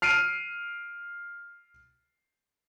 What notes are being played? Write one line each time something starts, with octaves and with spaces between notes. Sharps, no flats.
F6 C7 D7 D#7